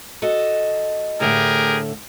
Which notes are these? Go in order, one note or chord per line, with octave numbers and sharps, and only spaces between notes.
F#4 A4 D#5
A2 D3 A3 G4 G#4 A#4